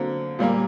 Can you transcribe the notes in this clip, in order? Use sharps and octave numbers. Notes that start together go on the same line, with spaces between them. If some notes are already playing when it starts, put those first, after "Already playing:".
Already playing: D3 F#3 A#3 C4
A#2 G3 A#3